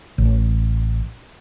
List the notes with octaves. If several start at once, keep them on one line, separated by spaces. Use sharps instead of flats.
A1